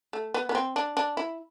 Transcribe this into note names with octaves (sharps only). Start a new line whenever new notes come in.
A3
B3
B3
C4
D4
D4
E4